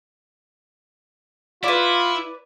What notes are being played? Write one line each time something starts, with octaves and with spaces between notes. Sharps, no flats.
E4 F4 B4 D5